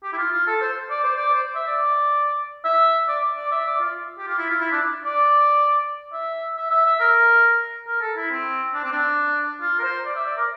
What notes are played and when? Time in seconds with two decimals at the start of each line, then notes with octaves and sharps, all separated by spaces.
0.04 G4
0.13 E4
0.18 F4
0.32 F4
0.47 A4
0.61 C5
0.90 D5
1.04 C5
1.16 D5
1.33 C5
1.55 E5
1.67 D5
2.64 E5
3.08 D5
3.37 D5
3.51 E5
3.66 D5
3.81 F4
4.18 G4
4.28 F4
4.39 E4
4.50 F4
4.60 E4
4.72 D4
5.05 D5
6.13 E5
6.57 E5
6.71 E5
6.86 E5
7.00 A#4
7.87 A#4
8.01 A4
8.16 E4
8.31 C4
8.74 D4
8.83 C4
8.92 D4
9.61 F4
9.79 A#4
9.83 C5
10.05 D5
10.16 E5
10.27 D5
10.38 A#4